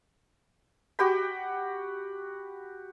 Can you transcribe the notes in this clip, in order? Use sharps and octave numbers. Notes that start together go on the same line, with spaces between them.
F#4 G4 G5 B5